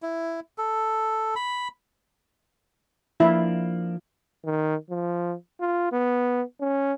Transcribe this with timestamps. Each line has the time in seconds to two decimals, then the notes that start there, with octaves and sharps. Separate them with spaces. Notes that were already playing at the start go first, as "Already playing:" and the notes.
0.02 E4
0.58 A4
1.36 B5
3.20 F3 A#3 D4 E4
4.45 D#3
4.90 F3
5.61 F4
5.92 B3
6.61 C#4